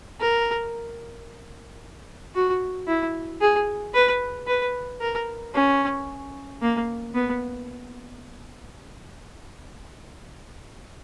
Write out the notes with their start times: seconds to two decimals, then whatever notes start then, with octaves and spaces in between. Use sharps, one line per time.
0.20 A#4
2.35 F#4
2.87 E4
3.41 G#4
3.94 B4
4.47 B4
5.01 A#4
5.54 C#4
6.62 A#3
7.14 B3